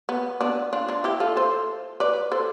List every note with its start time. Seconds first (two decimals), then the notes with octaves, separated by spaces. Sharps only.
0.09 B3
0.41 B3 D4
0.73 D4 F4
0.89 D4 F4
1.04 E4 G4
1.20 F4 A4
1.37 A4 C5
2.00 B4 D5
2.32 A4 C5